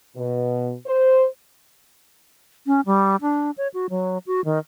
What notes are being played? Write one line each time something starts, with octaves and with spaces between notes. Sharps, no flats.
B2
C5
C#4
G3
D4
C#5
F#4
F#3
F#4
D#3